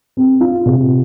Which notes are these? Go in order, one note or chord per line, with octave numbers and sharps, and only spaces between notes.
C4
F4
C3